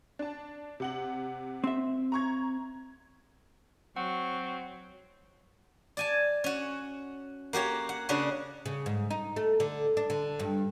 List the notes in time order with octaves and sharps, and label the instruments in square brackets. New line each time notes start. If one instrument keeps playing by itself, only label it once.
[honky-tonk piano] D4 A5
C3 F#5 F#7
[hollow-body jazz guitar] C4 E5
[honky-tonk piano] A#5 C#6 G#6
[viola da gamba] F#3 [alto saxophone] C4 [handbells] F#5 [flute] C#6
[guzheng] D5 G#5 A5
C#4 F#4
A#3 F#4 G4 C#5
F#5
C#3 C#4 D4 F#4
[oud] C#3
G#2
D#4
A3
D3
D4
D3
G2